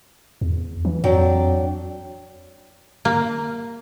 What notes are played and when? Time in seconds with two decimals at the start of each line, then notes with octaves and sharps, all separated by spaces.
0.41 E2
0.85 E3
1.04 F2 F#3 D4 G5
3.05 A#3